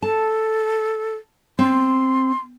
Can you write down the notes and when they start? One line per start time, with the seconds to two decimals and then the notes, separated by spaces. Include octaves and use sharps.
0.02 A4 A5
1.59 C4 C6